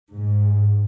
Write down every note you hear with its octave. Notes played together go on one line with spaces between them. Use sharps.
G#2